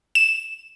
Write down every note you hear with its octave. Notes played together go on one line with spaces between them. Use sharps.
E7